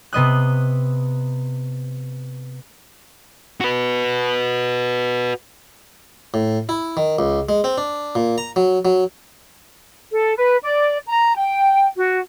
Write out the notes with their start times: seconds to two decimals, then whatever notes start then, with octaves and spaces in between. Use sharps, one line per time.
0.13 C3 B3 D#5 F#6
3.60 F#4 B4
6.34 A2
6.69 E4
6.97 D#3
7.19 C#2
7.49 G#3
7.64 C4
7.78 D4
8.15 A#2
8.38 A#5
8.56 F#3
8.85 F#3
10.12 A4
10.36 B4
10.63 D5
11.07 A#5
11.35 G5
11.97 F#4